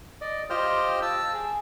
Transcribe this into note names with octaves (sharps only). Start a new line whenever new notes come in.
D5 D#5
F4 G4 C5 D#5 G5 F6
A5 E6
G#4